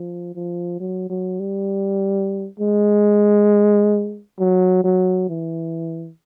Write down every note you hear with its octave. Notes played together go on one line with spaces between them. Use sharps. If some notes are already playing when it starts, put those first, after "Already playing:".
Already playing: F3
F3
F#3
F#3
G3
G#3
F#3
F#3
E3